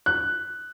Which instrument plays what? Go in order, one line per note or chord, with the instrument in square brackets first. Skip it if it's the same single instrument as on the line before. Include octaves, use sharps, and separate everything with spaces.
[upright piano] F#6